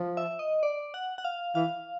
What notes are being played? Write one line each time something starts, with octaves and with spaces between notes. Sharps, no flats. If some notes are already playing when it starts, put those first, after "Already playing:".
Already playing: F3
E5
D#5
D5
F#5
F#5
F5
E3 F5